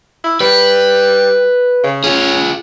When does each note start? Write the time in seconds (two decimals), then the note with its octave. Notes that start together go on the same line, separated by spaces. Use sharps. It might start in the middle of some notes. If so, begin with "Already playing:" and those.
0.24 E4
0.40 G3 B4
1.84 C#3
2.04 C#4 F4 G#4